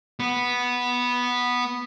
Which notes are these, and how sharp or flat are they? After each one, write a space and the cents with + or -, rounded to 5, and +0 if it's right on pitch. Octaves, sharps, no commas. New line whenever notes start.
B3 -5